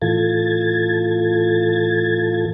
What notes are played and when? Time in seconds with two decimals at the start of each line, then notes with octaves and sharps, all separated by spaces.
0.02 A2 E3 F4 A4 G#6 A6